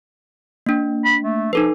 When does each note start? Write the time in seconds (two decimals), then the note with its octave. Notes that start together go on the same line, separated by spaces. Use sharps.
0.66 A#3 D4
1.05 B5
1.22 A3
1.53 F3 D#4 A4 B4